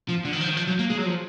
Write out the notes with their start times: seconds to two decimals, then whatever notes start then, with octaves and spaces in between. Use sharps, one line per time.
0.09 F3
0.25 D3
0.33 D#3
0.41 F3
0.49 D#3
0.57 F3
0.67 F#3
0.79 A#3
0.90 G#3
0.98 F#3
1.06 F3